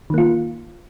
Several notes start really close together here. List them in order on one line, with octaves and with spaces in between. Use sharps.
D#3 A#3 F4